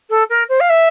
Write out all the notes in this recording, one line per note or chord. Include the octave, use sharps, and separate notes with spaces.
A4
A#4
C5
F5
E5